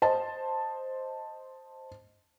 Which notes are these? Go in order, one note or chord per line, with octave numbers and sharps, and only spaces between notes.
C5 D#5 A5